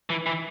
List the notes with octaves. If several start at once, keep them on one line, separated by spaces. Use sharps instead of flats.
E3
E3